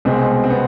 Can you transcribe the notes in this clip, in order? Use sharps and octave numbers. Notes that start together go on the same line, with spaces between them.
C2 B2 G#3 C4
C4
B3